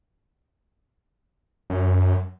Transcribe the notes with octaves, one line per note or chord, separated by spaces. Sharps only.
F#2